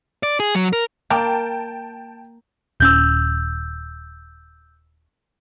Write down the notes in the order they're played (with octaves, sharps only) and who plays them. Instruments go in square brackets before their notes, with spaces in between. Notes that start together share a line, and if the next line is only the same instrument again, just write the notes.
[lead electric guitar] D5
G#4
F#3
A#4
[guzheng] A#3 [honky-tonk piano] G5 A5
[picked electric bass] D#1 C#4 [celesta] E6 G6